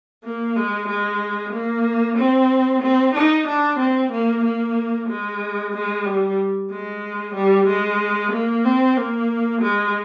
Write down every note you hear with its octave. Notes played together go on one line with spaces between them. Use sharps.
A#3
G#3
G#3
A#3
C4
C4
D#4
D4
C4
A#3
A#3
G#3
G#3
G3
G#3
G3
G#3
A#3
C4
A#3
G#3